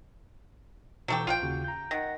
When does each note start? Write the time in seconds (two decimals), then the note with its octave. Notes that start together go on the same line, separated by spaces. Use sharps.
1.08 B2 E3 F#3 A3 G4
1.27 A#1 F4 F#5 G5
1.42 D#2 C#3 F#4
1.64 A#5 G6
1.91 D#3 F#5 A#6